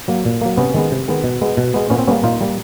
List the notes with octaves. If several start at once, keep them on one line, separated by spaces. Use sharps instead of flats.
F#3 A#3
A#2
F#3 A#3
C3 B3 C#4
D#3 G#3 B3
C3
D#3 G#3 B3
B2
G#3 B3
B2
G#3 B3
A#2 B3 C#4
C4
G3 A#3 B3 C#4
A#2 D#4 F4
G3 A#3